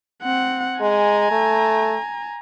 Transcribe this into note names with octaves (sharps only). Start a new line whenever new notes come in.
C4 F#5
G#3 G#5 A#5
A3